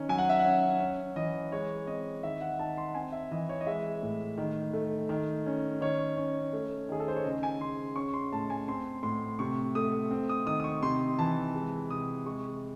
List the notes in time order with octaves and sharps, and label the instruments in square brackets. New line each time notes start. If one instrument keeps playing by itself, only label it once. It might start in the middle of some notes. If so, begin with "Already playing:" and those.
Already playing: [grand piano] D#3 C#4
F#3 G#5
F#5
E5
F#5
C#4
C#4
E3 D#5
G#3 C#5
C4 D#5
D#3 E5
F#5
D#3 A5
C6
C4 G#5
E5
E3 D#5
C#5
D#5
G#3 E5
A2
D#3
A3
D#3
C#4
D#3 C#5
C#4
A3
D#3 G#4
A4
C5
C#5
C#3 D#5
G#5
C#3 C6
C#4 C#6
C6
A2 A5
G#5
C4 C6
A2 C6
C3 C#6
A3 D#6
C4
D#6
D#3 D#6
D#6
C#6
C3 C6
E3 A5
G#3
C3 D#6
G#3 C#6